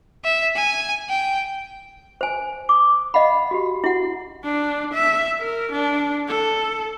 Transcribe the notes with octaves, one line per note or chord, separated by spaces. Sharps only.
E5
G#5
G5
C5 G#5
D6 D#6
D#5 F5 F#5 B5
F#4 G4
E4 F#4 F#5
D4
E5
A#4
D4
A4